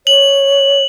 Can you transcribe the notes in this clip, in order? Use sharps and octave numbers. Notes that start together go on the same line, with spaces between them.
C#5 F#7